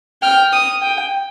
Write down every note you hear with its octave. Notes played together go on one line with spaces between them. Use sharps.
G5 F6
D#6
G5